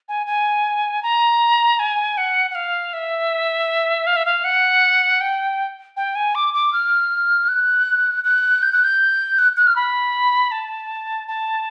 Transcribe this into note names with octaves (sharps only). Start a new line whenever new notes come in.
G#5
G#5
A#5
G#5
F#5
F#5
F5
E5
F5
E5
F5
F#5
G5
G5
G#5
D6
D6
F6
F#6
F#6
G6
F#6
G6
F#6
F#6
F6
B5
A5
A5